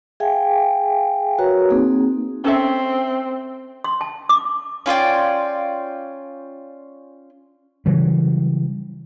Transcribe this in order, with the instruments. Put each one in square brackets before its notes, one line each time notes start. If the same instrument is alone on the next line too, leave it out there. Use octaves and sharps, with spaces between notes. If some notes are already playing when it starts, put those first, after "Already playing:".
[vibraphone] G#4 E5 F5 G5 G#5
F#4 A#4 B4 C#5 A#5
A#3 C4 D#4 G#4
[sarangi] C4 [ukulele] C#4 A4 E5
[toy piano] C6
A5
D6
[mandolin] C#4 F4 D5 G5
[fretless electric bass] C#3 E3 F#3 G3